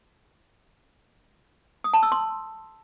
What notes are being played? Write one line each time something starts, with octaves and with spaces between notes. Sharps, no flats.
D#6
A5
E6
C6